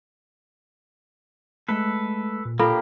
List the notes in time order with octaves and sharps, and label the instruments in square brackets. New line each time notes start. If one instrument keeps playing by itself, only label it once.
[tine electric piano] G#3 A3 [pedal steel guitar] A4 B4
[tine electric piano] A#2
[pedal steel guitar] A#3 D4 G4 [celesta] F4 A4 B5